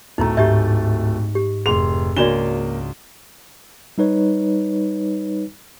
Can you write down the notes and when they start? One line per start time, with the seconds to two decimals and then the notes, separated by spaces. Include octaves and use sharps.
0.18 D1 A3 D#4 E4 A#5
0.37 G#2 G4 E5 G6 A6
1.35 G4
1.66 F1 G#4 C6 F7
2.17 C#2 A#3 D4 F#4 D5 E7 G7
3.98 G3 D#4 B4 C#5